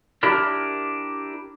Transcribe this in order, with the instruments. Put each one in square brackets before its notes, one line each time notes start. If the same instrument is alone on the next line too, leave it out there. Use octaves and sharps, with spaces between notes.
[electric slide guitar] D4 E4 G4 A#4